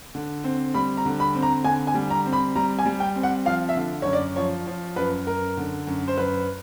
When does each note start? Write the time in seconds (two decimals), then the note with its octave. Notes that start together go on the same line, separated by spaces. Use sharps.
0.15 D3
0.44 C4
0.74 G3 B5
0.97 A#5
1.05 D3
1.20 B5
1.35 C4
1.43 A#5
1.64 D3 G#5
1.87 G#5
1.95 G3
2.10 A#5
2.26 C4
2.33 B5
2.56 G3 A#5
2.79 G#5
2.86 G3
3.00 G5
3.16 C4
3.23 F#5
3.45 F3 F5
3.69 E5
3.76 D3
4.02 F#2 C#5
4.13 D5
4.36 F3 C#5
4.67 F3
4.96 F#2 B4
5.27 F#2 A#4
5.57 D3
5.87 F#2
6.08 C5
6.17 F#2 B4